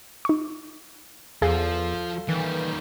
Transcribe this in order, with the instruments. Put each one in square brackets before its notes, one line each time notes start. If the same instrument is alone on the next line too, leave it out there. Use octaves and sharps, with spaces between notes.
[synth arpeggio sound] D#4 C#6
[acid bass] E2 [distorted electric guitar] F3 [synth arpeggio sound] G#4 [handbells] A4 F5
[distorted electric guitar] D#3 G3 [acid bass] E3